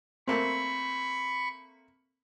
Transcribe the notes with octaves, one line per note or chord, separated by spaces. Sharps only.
A3 A#3 C4 B5 C#6